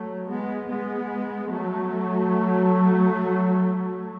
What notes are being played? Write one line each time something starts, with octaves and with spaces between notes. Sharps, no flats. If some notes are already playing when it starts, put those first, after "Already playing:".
Already playing: F#3 A3
G#3 B3
G#3 B3
F#3 A3